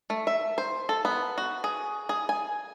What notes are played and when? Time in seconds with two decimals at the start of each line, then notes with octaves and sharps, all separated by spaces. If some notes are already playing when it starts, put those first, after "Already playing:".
0.10 A3
0.27 E5
0.58 C5
0.89 A4
1.05 B3
1.38 F#4
1.64 G#4
2.09 G#4
2.29 G#5